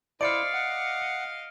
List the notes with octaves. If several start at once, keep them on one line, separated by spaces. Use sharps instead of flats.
E4 C5 D5 D#5 F5 F6 C#7 D7
F#5